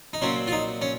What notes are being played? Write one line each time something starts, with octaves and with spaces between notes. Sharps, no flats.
D#4
A#2 F#3 C4 C#4
F4
D#4
C#4